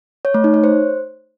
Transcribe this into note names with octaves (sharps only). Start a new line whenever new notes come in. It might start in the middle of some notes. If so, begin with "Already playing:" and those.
C#5
A3
D#4
C#5
C5